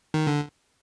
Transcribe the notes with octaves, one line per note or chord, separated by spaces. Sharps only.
D#3
D3